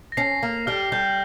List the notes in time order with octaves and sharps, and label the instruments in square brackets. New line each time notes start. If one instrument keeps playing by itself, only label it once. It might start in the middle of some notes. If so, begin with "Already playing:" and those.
[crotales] A#6
[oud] C#4 [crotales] C7
[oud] A#3
[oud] G3 [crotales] F6
[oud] G3 [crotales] G6